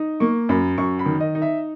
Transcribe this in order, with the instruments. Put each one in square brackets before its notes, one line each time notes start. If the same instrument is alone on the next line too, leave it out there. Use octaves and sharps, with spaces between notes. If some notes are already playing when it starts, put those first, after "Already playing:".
Already playing: [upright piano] D#4
A#3 C#6
F#2 B5
F#2 C#6
B5
D#3
D#5
D#4
E5